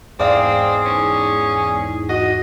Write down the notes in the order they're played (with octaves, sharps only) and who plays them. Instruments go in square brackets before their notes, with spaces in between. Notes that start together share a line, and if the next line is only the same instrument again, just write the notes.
[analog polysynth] E2 G#2 [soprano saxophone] C4 [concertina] G#4 [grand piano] D5 F5
[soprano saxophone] C#4
[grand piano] F#4 [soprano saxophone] D#5